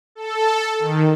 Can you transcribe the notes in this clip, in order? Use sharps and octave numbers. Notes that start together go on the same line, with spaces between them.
A4
D#3